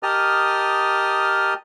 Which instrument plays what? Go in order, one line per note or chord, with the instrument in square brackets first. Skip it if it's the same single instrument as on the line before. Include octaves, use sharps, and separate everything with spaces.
[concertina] G4 A#4 D#5 A5 D#6 F6